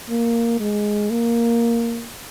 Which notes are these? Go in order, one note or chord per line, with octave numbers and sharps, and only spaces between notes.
A#3
G#3
A#3